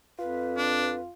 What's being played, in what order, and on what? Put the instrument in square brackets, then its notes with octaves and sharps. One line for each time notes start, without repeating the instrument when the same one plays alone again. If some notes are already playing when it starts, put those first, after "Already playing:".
[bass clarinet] F2 [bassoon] F4 [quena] B4
[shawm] D4